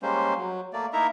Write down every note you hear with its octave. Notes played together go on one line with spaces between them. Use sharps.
G3 G#3 A#3 C#4 C5
F#3
A3 A#3 D5
A#3 D#4 E4 A#4 E5 A#5